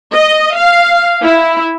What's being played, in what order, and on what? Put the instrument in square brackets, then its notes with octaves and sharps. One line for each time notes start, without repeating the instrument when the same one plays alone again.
[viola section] D#5
F5
E4